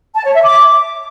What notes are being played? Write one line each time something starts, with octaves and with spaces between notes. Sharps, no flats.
A5
C#5
E5
D6